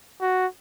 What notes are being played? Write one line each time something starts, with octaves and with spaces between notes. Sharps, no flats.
F#4